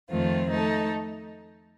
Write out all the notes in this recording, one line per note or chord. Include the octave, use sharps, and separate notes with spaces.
F2 D#3 A3 C4 F4
A3 D#4 A4